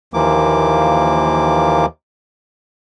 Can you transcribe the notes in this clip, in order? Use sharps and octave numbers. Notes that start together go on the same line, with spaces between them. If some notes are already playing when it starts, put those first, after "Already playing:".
D#2 E3 F3 A#3 D6